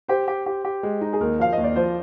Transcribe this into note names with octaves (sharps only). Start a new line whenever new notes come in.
G4 C5
G4
G4
G4
G#3
D#4
G#4
D#2 A#4
F3 F5
D#2 D#5
D5
F3 C5